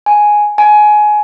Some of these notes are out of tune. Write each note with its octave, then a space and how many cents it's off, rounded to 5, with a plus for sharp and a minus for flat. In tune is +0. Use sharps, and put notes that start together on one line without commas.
G#5 +5
G#5 +20